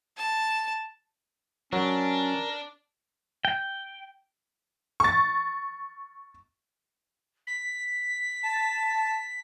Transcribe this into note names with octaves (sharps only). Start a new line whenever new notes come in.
A5
F#3 C#4 D4 A#4
G5
C#6 A6
B6
A5